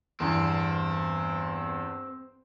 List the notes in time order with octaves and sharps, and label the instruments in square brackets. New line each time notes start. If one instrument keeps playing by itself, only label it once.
[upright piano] E2 G2 [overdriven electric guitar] C4